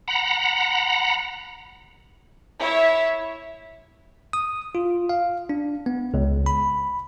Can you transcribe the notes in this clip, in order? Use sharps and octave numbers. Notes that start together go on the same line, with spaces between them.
F#5 A#5 B5
E4 C#5 E5
D#6
F4
F5
D4
B3
C#2
B5